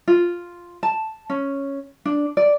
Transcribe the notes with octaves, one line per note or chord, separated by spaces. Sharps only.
F4
A5
C#4
D4
D5